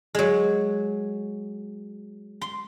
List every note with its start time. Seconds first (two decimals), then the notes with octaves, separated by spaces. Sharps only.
0.15 F#3 G#3
2.41 C6